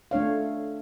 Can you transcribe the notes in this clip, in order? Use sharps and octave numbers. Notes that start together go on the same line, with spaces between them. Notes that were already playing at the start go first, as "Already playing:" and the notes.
A3 D4 C#5 F5